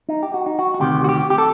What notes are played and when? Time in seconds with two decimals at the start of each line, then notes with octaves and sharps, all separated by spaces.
0.09 D#4
0.23 G4
0.34 F#4
0.46 D#4
0.59 F#4
0.74 F#4
0.80 D2 C3 D#3 G4
1.04 F#4
1.09 G4
1.30 G4
1.38 A4